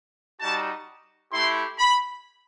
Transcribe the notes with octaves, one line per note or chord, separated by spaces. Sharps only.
G3 D#4 F#4 A5
A3 E4 G4 C6
B5